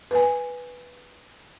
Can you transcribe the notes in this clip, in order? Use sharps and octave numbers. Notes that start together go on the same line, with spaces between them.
B4 G#5